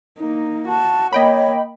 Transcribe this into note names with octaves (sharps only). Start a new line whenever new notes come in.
A#3 D#4
F#4 A5
A#3 C#5 D#5 G5 B5